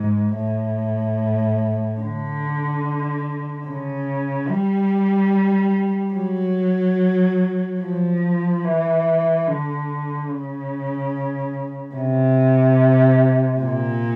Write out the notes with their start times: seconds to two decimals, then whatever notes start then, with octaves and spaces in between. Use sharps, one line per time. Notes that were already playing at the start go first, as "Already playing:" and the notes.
Already playing: G#2
0.36 A2
2.01 D3
3.67 C#3
4.49 G3
6.15 F#3
7.81 F3
8.64 E3
9.46 D3
10.30 C#3
11.95 C3
13.61 A#2